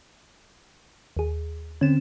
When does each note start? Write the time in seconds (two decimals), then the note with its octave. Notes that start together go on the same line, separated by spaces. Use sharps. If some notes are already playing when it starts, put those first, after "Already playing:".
1.17 D#2 G#4
1.81 D3 C4 C#4 E7